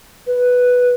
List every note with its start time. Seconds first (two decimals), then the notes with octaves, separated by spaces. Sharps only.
0.27 B4